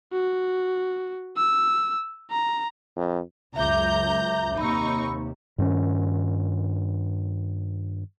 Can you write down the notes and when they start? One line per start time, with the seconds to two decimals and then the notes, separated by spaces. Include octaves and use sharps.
0.13 F#4
1.37 E6
2.31 A#5
2.96 F2
3.56 C#2 F#2 E5 A#5 D6 G6
4.58 D#2 C3 D#4 B5 C#6 E6
5.58 G2 D#3 C4 C#4